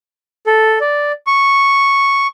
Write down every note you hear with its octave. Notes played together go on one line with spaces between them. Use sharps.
A4
D5
C#6